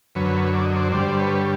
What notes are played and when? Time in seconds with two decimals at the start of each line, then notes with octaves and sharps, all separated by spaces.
0.15 F#2 D3 F#3 B4 C#5
0.54 D5
0.64 D#5
0.76 C5 D5
0.92 G2 D3 G3 C5 D5
1.12 C5
1.19 B4 C#5